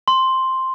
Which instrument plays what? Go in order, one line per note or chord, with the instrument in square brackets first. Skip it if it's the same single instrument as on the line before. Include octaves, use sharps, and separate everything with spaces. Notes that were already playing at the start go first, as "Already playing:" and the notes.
[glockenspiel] C6